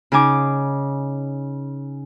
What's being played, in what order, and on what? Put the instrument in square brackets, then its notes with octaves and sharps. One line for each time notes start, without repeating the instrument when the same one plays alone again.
[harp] C#3 D#4 G#5 D6